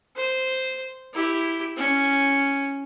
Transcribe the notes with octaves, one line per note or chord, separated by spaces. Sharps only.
C5
E4 G4
C#4